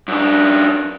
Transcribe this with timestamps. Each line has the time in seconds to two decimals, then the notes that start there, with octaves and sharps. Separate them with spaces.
0.08 F#2 D4